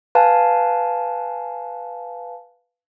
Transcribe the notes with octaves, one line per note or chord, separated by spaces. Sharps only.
B4 F5 G#5 A5